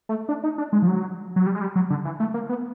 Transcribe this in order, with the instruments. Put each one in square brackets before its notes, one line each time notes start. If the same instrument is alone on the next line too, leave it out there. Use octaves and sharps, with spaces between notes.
[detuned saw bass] A3
D4
D#4
D4
G#3
F3
F#3
F#3
G3
G#3
G3
F#3
D3
E3
A3
A#3
B3